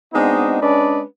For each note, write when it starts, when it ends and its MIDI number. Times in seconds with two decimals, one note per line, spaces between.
0.13 0.57 56
0.13 0.57 59
0.13 0.57 60
0.13 0.57 62
0.13 0.57 63
0.13 0.57 66
0.61 1.01 56
0.61 1.01 61
0.61 1.01 62
0.61 1.01 71
0.61 1.01 74